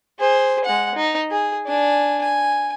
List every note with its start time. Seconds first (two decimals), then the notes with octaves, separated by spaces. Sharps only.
0.19 G#4 C5
0.65 G#3 F#5
0.95 D#4
1.31 G#4
1.66 D4 G#5
2.22 G#5